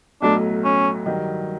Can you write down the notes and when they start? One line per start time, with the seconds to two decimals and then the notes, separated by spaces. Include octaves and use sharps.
0.22 B1 A2 F#3 A3 D4
0.64 C#4
1.06 G2 D#3 F#3